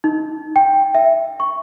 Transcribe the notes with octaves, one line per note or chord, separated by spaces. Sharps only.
D#4
G5
E5
C#6